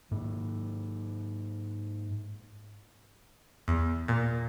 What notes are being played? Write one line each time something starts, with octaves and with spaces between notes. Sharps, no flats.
G#2 A#3
E2
A#2